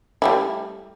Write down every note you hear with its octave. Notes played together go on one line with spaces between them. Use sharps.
G3 A3 E4